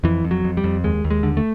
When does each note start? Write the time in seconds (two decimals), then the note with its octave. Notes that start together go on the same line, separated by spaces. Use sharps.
0.04 F2 E3
0.24 F2
0.31 F#3
0.44 F2
0.57 G3
0.64 F2
0.84 D#2 G#3
1.04 D#2
1.10 G#3
1.23 D3
1.37 A3